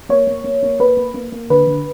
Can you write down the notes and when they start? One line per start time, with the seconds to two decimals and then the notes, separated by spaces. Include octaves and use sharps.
0.09 A#3 C#5
0.27 A#3
0.44 A#3
0.63 A#3
0.80 A#3 B4
0.97 A#3
1.14 A#3
1.32 A#3
1.50 D3 B4
1.67 D3